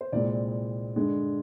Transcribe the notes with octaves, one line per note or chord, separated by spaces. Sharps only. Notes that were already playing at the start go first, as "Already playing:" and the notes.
C5
C2 A#2 G#3 C4 D5
G2 D3 G#3